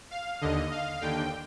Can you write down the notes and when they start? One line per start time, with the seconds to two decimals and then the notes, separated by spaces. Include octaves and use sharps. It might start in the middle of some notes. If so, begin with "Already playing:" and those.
0.11 F5
0.41 D#2 D3 D#5
0.71 F5
1.01 D#2 D3 G5